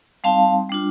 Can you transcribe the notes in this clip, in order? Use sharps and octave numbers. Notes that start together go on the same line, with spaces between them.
G3 C4 D#4 F5 A5
G3 D4 F4